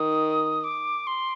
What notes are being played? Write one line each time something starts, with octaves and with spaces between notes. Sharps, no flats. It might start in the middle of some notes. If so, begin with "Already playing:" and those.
Already playing: D#3 D#6
D6
C6